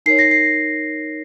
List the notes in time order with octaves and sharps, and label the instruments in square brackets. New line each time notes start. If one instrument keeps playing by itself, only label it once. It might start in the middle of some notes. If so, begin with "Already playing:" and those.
[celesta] D#4 A#4 C#5 C7
A#6
C7